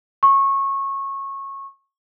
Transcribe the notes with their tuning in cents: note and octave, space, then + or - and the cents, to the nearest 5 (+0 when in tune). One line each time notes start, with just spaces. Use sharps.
C#6 -20